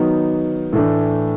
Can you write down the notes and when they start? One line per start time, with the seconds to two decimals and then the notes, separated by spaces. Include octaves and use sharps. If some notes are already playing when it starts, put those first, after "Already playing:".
Already playing: D#3 F#3 B3 D#4
0.73 A2 E3 A3 D4